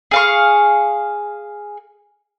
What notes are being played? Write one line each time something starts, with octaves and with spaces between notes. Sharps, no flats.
G#4 F5 C#6